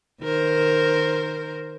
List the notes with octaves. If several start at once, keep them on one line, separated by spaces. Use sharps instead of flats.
D#3 A#4 C5